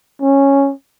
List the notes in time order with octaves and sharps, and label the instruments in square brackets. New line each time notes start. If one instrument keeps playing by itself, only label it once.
[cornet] C#4